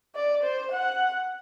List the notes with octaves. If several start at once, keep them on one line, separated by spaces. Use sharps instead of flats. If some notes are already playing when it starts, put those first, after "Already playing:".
D5
C5
F#5